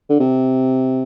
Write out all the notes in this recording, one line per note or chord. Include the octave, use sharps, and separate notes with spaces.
D3
C3